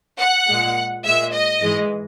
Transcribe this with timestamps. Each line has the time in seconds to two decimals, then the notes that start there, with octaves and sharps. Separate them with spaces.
0.18 F#5
0.47 A#2 G#3
1.04 A#2 G#3 E5
1.32 D#5
1.61 G#2 E3 G#3